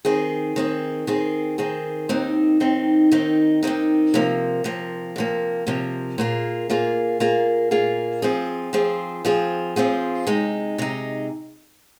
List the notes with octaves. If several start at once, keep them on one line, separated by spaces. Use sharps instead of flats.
D#3 C4 G#4
D#3 C4 G#4
D#3 C4 G#4
D#3 C4 G#4
D#2 D#3 C4 D#4
D#2 D#3 C4 D#4
D#2 D#3 C4 D#4
D#2 D#3 C4 D#4
C3 F3 A#3
C3 F3 A#3
C3 F3 A#3
C3 F3 A#3
A#2 A#3 F4 G#4
A#2 A#3 F4 G#4
A#2 A#3 F4 G#4
A#2 A#3 F4 G#4
F3 C4 F4 G#4
F3 C4 F4 G#4
F3 C4 F4 G#4
F3 C4 F4 G#4
C3 G#3 D#4
C3 G#3 D#4